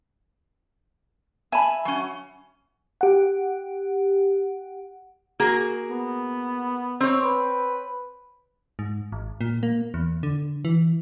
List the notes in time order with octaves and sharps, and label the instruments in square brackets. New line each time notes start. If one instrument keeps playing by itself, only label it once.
[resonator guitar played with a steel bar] E5 [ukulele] G#5 A5 B5
[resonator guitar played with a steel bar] F#3 C#4
[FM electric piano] G4 F#5
[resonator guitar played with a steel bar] A#3 F#4 G#4
[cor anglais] B3
[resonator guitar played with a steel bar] C4 C#5
[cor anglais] B4
[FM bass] G#2
G#1
A#2
A#3
E2
D3
E3